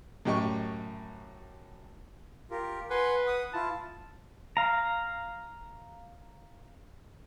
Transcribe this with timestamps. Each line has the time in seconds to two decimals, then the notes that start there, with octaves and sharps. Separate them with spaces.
0.25 F#2 A2 G4 D#5 C#6
2.51 F4 G4 A#4
2.90 B4 F#5 G#5 C6
3.27 F#5 D#6
3.54 E4 F4 A5
4.57 F5 A#5